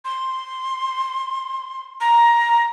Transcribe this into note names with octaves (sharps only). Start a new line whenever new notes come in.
C6
A#5